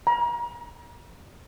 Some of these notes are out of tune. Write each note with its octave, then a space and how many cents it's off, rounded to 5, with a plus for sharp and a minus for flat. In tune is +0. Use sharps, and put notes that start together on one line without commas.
A#5 +35